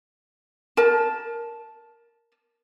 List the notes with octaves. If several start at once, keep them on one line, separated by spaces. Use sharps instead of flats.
A#4 A5